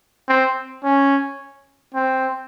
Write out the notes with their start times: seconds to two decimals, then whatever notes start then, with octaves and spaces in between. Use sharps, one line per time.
0.29 C4
0.84 C#4
1.94 C4